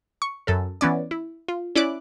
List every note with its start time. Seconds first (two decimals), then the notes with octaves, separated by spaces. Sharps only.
0.22 C#6
0.47 F#2 A4 A#4
0.81 E3 B3 C#4 D5
1.11 E4
1.48 F4
1.76 C#4 E4 D5 D6 F#6